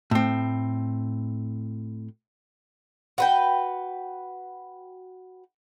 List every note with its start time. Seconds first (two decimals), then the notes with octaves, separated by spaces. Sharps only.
0.11 A2 C4
3.18 F#4 B4 G5